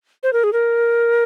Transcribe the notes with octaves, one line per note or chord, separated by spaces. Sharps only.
C5
A#4
G#4
A#4